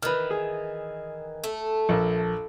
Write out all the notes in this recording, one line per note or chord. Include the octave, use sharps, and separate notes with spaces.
D#3 E3 B4 F6
G#4
A3
A#1 A#4